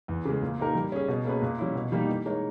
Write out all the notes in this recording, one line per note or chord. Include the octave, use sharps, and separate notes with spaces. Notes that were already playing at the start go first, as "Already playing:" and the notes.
E2
C#3 G#3
A#2
A#3 D#4 G4 A#4
G3
C#4 G#4
B2
A#3 C#4 G#4 B4
A#2
G3 C#4 E4
B2
G3 A#3 D#4 G4
E3
G#3 D#4 A#4 C#5